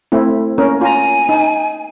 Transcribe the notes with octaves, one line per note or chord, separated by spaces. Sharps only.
A3 C4 E4
A#3 C#4 A#4
F4 G#5 A#5
D#4